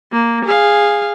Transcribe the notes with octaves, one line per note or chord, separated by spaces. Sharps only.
A#3
G#4 F5